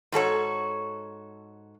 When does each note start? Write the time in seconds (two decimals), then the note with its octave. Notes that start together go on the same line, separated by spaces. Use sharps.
0.12 G#2 F#4 A4 C#5